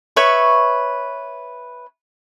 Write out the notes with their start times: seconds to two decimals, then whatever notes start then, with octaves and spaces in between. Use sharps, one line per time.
0.16 B4 C#5 E5 C#6